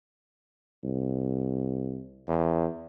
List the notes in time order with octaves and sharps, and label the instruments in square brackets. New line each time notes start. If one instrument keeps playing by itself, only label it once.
[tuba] C2
[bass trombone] E2